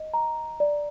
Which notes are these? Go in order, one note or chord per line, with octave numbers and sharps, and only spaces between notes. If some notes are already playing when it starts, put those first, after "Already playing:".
Already playing: D#5
A#5
D5